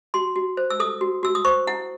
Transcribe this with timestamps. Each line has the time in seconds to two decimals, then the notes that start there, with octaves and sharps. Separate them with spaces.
0.14 F#4 C6
0.36 F#4
0.57 C5
0.70 E6
0.80 A4 D#6
1.01 F#4
1.23 F#4 E6
1.35 D#6
1.45 C5 C#6
1.67 E4 F#5